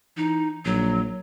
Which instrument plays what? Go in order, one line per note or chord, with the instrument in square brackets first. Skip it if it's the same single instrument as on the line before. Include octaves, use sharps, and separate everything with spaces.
[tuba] E3 [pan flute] D#4
[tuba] A#1 [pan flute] F#3